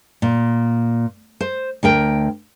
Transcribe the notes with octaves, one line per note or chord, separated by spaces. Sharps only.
A#2
C5
D2 A#4 G5